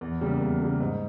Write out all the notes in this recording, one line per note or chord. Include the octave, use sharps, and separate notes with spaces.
E2
C#3 G3 A#3
E2
C#3 G3 A#3
G#2